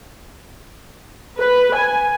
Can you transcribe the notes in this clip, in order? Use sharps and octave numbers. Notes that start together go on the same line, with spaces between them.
B4
G#5